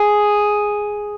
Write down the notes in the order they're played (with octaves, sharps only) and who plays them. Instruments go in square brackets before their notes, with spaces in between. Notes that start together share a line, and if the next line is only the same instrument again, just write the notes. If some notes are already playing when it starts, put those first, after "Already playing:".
Already playing: [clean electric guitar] G#4